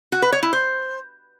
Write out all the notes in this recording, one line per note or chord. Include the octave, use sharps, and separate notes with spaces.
F#4
B4
C#5
E4
C5